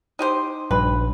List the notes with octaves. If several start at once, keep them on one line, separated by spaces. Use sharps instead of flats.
D#4 G4 C5
A#1 G2 B4